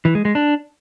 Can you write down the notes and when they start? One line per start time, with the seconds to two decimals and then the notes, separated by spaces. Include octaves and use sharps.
0.05 E3
0.15 G#3
0.25 G#3
0.35 D4